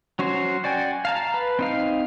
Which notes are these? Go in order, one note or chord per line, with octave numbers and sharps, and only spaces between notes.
F#3 C#4 F#4 C5
F#4 D5 G5 G#5
F5 A5 A#5
B4
C4 D#4 F5